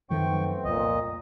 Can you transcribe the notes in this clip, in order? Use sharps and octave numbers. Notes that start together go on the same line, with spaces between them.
F#2 D#3 F3 A3 B3 C4 G5 C#6
C2 F2 A#2 D#5